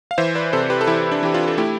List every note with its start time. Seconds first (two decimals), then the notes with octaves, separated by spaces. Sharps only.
0.11 F5
0.18 E3 C5 E5
0.35 B4 D5
0.53 C3 A4 C5
0.63 A4
0.70 G4 B4
0.81 A4
0.87 E3 E4 G4
1.12 D4
1.23 E3 G4
1.34 D4 F4
1.48 A4
1.57 A3 E4 G4